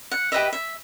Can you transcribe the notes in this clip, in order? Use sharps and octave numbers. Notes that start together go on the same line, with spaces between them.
F#5
G4 B4 D#5 E5
E5